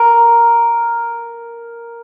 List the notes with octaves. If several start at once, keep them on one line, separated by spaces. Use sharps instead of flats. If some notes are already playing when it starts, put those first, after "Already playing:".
Already playing: A#4